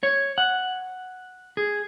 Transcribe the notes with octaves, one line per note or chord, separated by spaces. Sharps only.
C#5
F#5
G#4